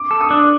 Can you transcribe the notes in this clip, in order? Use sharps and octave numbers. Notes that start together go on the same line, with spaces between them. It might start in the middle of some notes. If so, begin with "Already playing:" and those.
Already playing: D6
A4
D#6
D4